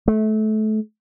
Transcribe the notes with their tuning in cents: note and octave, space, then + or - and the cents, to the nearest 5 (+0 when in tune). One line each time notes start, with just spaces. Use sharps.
A3 -25